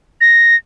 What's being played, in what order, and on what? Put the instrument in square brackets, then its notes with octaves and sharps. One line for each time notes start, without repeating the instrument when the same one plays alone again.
[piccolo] A#6